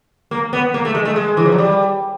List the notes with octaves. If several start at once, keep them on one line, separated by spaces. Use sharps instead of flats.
A#3
B3
A#3
A3
G#3
A3
G#3
E3
F3
F#3
G3